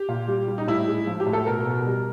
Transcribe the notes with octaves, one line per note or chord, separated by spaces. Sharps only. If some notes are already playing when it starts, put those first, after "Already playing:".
Already playing: G4
A#2
G3
G3
D#4
A2 E4
G#3
F3
G4
A2
A4
B2 A#4
B2
G3